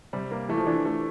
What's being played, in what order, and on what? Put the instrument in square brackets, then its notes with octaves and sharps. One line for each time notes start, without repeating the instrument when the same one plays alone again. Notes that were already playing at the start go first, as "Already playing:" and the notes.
[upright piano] C3 [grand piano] G3
[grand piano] A#3
[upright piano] E3 [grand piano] A3
[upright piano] F3
[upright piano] E3 [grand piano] D4
[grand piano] A3